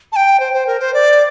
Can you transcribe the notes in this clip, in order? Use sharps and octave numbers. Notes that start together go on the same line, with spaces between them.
A5
G5
C5
C5
A#4
C5
D5